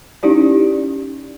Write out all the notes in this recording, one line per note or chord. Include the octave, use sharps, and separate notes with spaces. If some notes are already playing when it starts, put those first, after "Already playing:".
C#4 D#4 E4 G4 D5